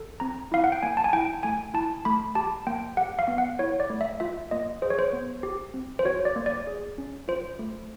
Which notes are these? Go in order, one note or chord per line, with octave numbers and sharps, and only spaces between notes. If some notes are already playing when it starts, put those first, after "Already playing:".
Already playing: A4
C4 A#5
E4 F5
F#5
G5
A#3 G#5
A5
G#5
E4 G5
A3 G#5
E4 A5
A3 B5
G4 A5
A#3 G5
G4 F#5
F5
B3
F#5
E4 C#5
D5
A3
E5
F4 E5
A#3 D#5
G#4 C5
C#5
C5
B3
G4
C4
C5
F#4 C#5
D5
A#3
D5
G#4
C#4
F4 C5
A3